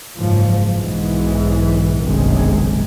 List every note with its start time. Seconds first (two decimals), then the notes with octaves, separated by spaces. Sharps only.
0.17 F#1 G#2 F3
0.76 B1 G#2 E3
2.04 F#1 B1 G2 C3 D#3 G#3